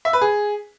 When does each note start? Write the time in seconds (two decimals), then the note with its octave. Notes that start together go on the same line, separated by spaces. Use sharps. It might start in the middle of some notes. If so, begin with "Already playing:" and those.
0.05 E5
0.13 B4
0.22 G#4